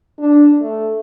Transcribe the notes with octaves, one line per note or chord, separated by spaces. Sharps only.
D4
A3